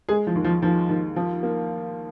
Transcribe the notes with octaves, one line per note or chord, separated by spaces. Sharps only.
G#3 G#4
F3
D#2
F3
D#2 F3
D#2
F3
A#3